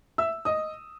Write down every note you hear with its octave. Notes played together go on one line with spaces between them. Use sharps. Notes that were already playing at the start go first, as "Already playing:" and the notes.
E5 E6
D#5 D#6